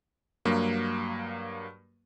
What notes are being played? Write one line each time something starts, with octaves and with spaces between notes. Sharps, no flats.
G2 F#3 A#3